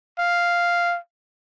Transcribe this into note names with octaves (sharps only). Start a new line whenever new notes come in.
F5